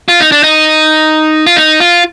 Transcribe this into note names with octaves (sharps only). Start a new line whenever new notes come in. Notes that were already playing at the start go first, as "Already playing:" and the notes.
F4
D#4
D4
D#4
F4
D#4
F4